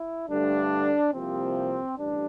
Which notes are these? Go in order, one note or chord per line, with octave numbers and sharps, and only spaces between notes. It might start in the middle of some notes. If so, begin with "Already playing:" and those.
Already playing: E4
G2 D3 A3 D4
C2 C3 F3 A#3 C4
A1 G2 D4